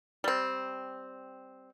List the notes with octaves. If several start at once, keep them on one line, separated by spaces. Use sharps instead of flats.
G3 C4